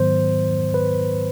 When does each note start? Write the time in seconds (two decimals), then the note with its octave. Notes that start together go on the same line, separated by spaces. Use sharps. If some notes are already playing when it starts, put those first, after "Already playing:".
Already playing: G#2 D#3 F#3 B3 C5
0.74 B4